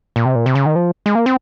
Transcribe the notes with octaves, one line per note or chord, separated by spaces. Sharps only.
A#2
C3
A#2
C3
C#3
D#3
F3
G#3
A#3
C4